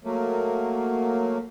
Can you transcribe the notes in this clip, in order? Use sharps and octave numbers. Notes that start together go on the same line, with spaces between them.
F#3 A3 A#3